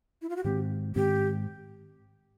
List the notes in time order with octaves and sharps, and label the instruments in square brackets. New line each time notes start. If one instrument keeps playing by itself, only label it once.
[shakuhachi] E4
F4
F#4
[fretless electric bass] G#2 D#3 G#3 C4 [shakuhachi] G4
[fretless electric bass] G#2 D#3 G#3 C4 [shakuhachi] G4